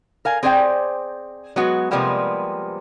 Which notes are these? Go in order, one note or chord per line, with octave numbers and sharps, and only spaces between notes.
A#4 F5 G#5
C4 G#4 C5 D5 F5 G5
F#3 G#3 B3 F#4
C3 F3 G3 G#3 A#3 B3